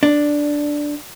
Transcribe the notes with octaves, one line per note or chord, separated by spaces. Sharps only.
D4